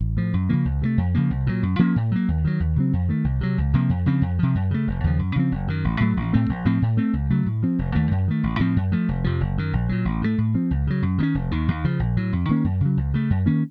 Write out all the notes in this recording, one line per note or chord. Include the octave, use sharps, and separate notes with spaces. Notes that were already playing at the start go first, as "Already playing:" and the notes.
A1
A2 F3
F#2
C#3 F3 A#3
C#2
C3 D#3 A3
F2
C#3 F3 A#3
C2
A#2 F#3
F#2
F3 A#3 C#4
A2
F#3 A#3
D#2
D#3 F#3
D#2
C#3 F#3 C4
F2
D#3 A3
C2
C3 F#3
C#2
C3 F3 A#3
F2
C#3 F3 C4
F2
C3 F3
F#2
C#3 A3
F1
D#2 C#3 F3
F#2
C#3 F3 C4
F#1
F#2 D#3
A1
A2 F#3 A3
A1
A2 A3 C4
A#1
A2 F3 C4
A2
A3 C4
C#2
C#3 F#3 A3
A2
F3 C4
F1
D#2 D#3 A3
F#2
D#3 A3
A1
A2 F3 C4
F#2
F3 A3
F1
F2 C3 F3
F#1
F#2 D#3
A#1
A#2 F#3
A1
A2 F3 A3
A2
F3 C4
C#2
C#3 F#3
F#2
D#3 A#3 C#4
F1
D#2 D#3
D#2
C#3 F3
A#1
A2 F#3
F2
D#3 A#3 C#4
F#2
C#3 F#3
C#2
C#3 A3
F#2
D#3 A#3 C#4